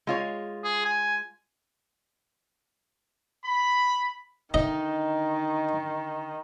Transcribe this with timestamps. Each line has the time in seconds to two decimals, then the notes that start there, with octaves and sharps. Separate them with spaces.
0.07 G#3 F4 C#5
0.64 G#4
0.85 G#5
3.44 B5
4.54 D3 D#3 D4 D#4 D#5